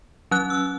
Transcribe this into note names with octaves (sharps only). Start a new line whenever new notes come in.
F#3 C#4 F#6
E6